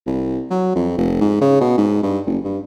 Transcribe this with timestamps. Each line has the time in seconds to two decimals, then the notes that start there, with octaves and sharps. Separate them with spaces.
0.06 C2
0.50 F#3
0.75 F2
0.98 F1
1.21 G#2
1.41 C#3
1.60 B2
1.78 G#2
2.03 G2
2.26 F#1
2.44 G2